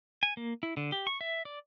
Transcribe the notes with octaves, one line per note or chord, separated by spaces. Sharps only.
G#5
A#3
E4
D3
G4
C#6
E5
D5